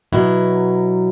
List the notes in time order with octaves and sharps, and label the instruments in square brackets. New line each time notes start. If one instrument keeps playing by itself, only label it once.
[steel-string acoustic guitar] B2 F#3 E4 A#5